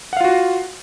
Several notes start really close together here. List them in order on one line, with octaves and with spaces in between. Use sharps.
F#5 F5 F4 F#4